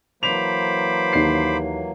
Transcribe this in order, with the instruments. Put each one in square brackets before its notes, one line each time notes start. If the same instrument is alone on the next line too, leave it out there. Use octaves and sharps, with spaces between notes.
[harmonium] E3 F#3 A#3 [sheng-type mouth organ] C5 B5 D6 [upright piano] F7
[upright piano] D#2 C7